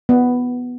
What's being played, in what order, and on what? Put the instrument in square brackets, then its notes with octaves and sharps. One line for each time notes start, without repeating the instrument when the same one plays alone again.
[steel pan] B3